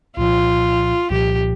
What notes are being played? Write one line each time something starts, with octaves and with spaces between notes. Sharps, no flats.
C2 A#2 F3 F4
C2 A#2 F3 G4